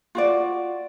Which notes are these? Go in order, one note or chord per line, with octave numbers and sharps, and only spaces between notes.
F4 F#4 D5